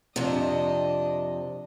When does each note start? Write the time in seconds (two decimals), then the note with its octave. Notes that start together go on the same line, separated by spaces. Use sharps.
0.16 F2 C3 D4 D#5